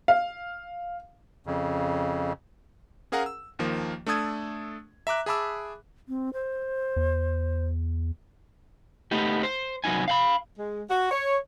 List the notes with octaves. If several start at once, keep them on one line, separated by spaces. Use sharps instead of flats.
F5
F2 C#3
C#4 G#4 A#4 F5 F#5 A#5
E6
D#2 D#3 F3 A#3
A3 D4 A4 D#6 G#6
E5 A#5 D6 F#6
G#4 E5 A5 B5 D6 E6
C4
C5
E2
A3 B3 D#4 G4
C5
C2 F#3 B3 D#4 G#5
F5 F#5 B5
G#3
F#4
C#5